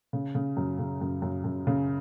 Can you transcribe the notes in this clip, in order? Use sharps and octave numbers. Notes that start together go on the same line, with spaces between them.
C#3
C#3
F#2
C#3
F#2
F#2
F#2
C#3